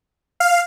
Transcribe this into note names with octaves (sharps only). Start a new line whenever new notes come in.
F5